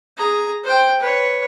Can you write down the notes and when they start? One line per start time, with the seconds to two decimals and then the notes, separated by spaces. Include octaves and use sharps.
0.17 G#4 A#5
0.64 C5 G5
0.99 B4 C#5